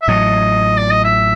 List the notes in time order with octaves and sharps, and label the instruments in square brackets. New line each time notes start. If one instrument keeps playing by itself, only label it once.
[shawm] E5
[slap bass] A1 A2 F#3 [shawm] D#5
[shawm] D5
D#5
E5